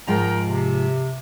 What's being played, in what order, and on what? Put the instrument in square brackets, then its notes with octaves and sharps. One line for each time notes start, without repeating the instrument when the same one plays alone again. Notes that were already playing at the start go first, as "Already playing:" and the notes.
[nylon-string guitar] G#2 F3 G#3 [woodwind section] A#4 G5 A#5
[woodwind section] C3